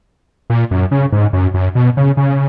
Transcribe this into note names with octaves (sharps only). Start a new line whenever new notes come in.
A#2
F#2
C#3
G#2
F#2
F#2
B2
C#3
C#3